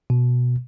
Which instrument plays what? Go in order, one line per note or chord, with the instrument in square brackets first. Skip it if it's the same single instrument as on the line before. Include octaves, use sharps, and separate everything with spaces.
[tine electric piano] B2